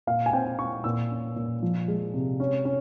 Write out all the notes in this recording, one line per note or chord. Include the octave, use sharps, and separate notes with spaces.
A#2 F5
G#5
C4 G5
C4 C#6
A#2 E6
C#4
A#2
F3
G#3
C3
C#4
C#4